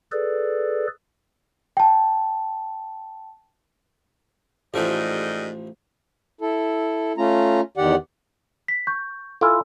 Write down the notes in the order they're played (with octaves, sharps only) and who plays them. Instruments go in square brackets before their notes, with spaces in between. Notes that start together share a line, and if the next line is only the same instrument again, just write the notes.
[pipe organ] G#4 A4 B4 D5
[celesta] G5 A5
[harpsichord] A1 F3 A3 [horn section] G#2 G3 D#5
[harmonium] E4 A4
A3 C#4 F4 A#5
E2 D#3 G4 D5 F#5
[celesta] B6
C#6 G6
[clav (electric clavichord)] E4 F4 [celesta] A4 G#5 E6